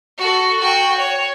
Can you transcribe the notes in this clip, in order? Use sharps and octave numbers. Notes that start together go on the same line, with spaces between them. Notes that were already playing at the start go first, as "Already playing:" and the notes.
F#4 A4
F#4 G5
C#5